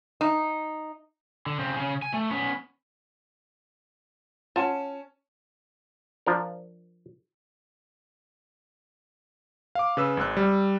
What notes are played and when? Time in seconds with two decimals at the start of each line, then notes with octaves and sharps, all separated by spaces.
0.21 D#4
1.46 D3
1.59 C#3 C4
1.77 C#3 C#4
2.02 G#5
2.14 A3
2.30 B3 C#4
4.56 C#4 F4 F#5 A5 E7
6.26 F3 D4 A#4
9.75 F5 D6
9.97 C#3 B4 E6
10.17 G#1 G#3 E6 F#6
10.37 G3